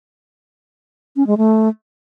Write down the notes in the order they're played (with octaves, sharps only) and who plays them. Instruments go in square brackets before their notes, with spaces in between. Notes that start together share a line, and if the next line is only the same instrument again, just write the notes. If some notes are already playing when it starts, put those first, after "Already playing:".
[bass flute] C#4
G#3
A3